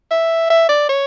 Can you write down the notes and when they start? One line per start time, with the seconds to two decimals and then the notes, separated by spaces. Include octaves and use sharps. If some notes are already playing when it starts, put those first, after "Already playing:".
0.11 E5
0.50 E5
0.69 D5
0.89 C#5